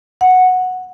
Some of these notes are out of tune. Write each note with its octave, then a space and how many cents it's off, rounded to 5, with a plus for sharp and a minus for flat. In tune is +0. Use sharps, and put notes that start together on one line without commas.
F#5 -5